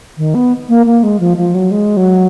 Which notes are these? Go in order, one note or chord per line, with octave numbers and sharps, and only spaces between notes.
D#3
B3
A#3
A#3
G#3
F3
F3
F#3
G#3
F#3